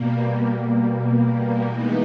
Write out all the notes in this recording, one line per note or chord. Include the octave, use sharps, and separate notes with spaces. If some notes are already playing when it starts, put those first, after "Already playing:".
Already playing: B2 G3 A#3
E3 G#3 B3 D#4